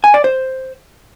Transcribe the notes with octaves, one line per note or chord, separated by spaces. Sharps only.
G#5
D5
C5